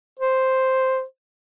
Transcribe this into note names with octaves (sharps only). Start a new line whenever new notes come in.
C5